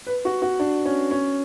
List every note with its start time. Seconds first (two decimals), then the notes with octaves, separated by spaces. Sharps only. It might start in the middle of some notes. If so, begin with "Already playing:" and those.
0.07 B4
0.25 F#4
0.42 F#4
0.60 D4
0.85 C#4
1.11 C#4